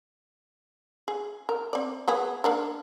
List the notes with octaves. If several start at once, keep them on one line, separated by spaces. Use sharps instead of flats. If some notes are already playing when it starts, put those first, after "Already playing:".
G#4
A#4
C4 D5
A#3 B3 G#4
A#3 D4 A#4